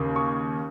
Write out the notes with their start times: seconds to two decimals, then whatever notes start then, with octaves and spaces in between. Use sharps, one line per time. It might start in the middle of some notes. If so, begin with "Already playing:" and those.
Already playing: D#2 C#3
0.16 C#6